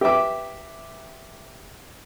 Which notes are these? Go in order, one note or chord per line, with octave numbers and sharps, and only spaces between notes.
G4 B4 E5 D6